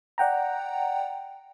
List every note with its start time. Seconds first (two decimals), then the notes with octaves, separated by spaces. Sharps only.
0.18 D5 F#5 G5 A#5